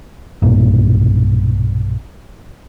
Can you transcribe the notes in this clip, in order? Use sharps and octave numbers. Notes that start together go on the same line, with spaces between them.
B1 G2 A#2